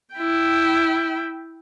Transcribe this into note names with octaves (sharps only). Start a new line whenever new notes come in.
E4 G5